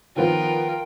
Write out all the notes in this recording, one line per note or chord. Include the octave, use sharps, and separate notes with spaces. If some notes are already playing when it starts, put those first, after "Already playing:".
D#3 F3 B3 F4 A#4 G5